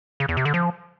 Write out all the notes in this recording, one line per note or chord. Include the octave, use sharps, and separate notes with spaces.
C#3
E2
C3
D3
F3